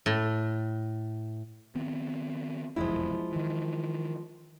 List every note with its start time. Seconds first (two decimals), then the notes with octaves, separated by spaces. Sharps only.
0.06 A2
1.75 D#3 B3 C4
2.76 F1 B1 E2 F3 G#3 E4
3.32 D#3 E3